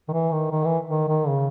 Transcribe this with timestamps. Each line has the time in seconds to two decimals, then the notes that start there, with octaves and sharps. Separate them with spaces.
0.08 D#3
0.13 E3
0.32 D#3
0.51 D#3
0.64 E3
0.89 D#3
1.08 D#3
1.28 C#3